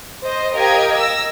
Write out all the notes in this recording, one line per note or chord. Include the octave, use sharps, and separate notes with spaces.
C5 D#5
G4 A#4 D#5 F5 G5 G#6
E6 A#6